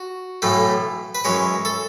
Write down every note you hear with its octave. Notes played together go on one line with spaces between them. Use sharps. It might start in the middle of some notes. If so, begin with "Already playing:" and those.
Already playing: F#4
B1 A2 E3 A3
B4
F#2 E3 G#3 C#5
A4